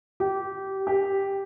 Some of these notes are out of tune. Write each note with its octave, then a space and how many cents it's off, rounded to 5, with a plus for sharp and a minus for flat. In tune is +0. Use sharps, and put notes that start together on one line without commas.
G4 -20
G4 +0